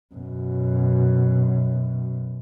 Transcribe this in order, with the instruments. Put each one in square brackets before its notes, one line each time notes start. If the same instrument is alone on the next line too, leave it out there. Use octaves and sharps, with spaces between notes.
[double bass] F#2 B2